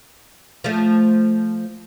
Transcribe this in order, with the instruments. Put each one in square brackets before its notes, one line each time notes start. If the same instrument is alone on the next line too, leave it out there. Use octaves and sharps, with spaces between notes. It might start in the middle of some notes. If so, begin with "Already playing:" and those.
[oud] F3 A3